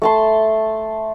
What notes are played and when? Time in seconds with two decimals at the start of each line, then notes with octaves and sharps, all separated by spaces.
0.02 A3 A5 C6